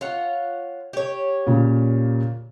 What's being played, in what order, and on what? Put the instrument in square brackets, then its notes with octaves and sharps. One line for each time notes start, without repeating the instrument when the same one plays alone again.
[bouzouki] F4 C#5 F#5
G4 C#5
[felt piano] A#2 C#3